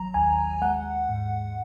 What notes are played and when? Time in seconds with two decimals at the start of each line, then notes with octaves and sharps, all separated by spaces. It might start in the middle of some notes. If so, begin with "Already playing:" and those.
Already playing: G#1 F#3 A#5
0.14 D#2 G#5
0.62 G#3 F#5
1.09 G#2